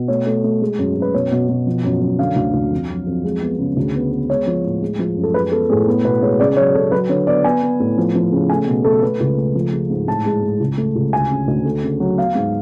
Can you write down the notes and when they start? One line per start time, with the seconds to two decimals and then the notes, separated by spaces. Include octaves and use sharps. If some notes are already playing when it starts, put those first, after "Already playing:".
Already playing: B2
0.08 A3 C#5
0.26 A3
0.44 A3
0.61 G#3
0.78 F#2
0.96 F#2
1.02 B4
1.14 B2 C#5
1.31 B2
1.49 B2
1.67 F3
1.84 F#2
2.01 F#2
2.19 D3 F5
2.36 D2
2.54 D2
2.71 F2
2.89 F#3
3.07 F2
3.24 G#3
3.42 B3
3.59 C#3
3.77 D2
3.95 B3
4.12 B3
4.29 G#3 C#5
4.46 F3
4.65 A2
4.82 G#3
4.99 F3
5.17 F#2
5.23 A4
5.34 G#3 B4
5.52 B3 A4
5.70 A2 G#4
5.87 B3
6.04 B2 B4
6.22 G#3 C#5
6.39 C#3 D5
6.57 F#3 C#5
6.74 C#3 A4
6.92 F#3 B4
7.09 D3 C#5
7.27 B3 D5
7.44 B3 G#5
7.62 B3
7.80 A2
7.98 F3
8.15 F3
8.32 C#3
8.50 A3 G#5
8.68 B2
8.85 A3 A4
9.02 A3 B4
9.20 C#2
9.38 A3
9.55 F3
9.73 G#3
9.90 G#2
10.07 A2 A5
10.26 G#3
10.43 A2
10.60 C#2
10.77 A3
10.95 C#2
11.13 D2 G#5
11.30 C#3
11.48 D2
11.65 A3
11.83 C#3
12.00 F#3
12.17 B3 F5
12.35 G#2